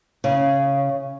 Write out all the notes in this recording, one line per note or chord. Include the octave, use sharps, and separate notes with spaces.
C#3